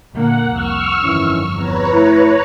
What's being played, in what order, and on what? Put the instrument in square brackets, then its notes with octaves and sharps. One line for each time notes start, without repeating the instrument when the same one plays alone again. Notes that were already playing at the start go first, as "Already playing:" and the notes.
[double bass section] A#2 D3 A#3 [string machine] F#5
[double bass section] C2 F2 [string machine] C#6 E6 F6
[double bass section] G1 F2 [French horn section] D#3 E3 C#4
[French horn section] E2 [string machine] B4 C#5 A#5
[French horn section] A3 E4